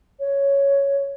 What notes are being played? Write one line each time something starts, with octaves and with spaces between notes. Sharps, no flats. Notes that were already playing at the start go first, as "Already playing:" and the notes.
C#5